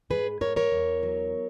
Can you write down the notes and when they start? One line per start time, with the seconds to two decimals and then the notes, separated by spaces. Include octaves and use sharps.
0.10 G#2 G#4 B4
0.41 G#2 A#4 C#5
0.56 A#4 C#5
0.72 E2
1.03 F#3